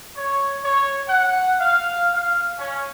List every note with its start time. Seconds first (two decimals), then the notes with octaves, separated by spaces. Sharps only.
0.16 C#5
0.63 C#5
1.09 F#5
1.60 F5
2.13 F5
2.59 C#4